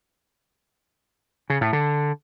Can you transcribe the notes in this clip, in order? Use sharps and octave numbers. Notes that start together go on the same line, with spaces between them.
C#3
A2
D3